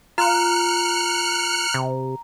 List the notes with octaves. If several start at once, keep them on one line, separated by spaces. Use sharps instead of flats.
F4 A#5 F6 F#6 C#7
C3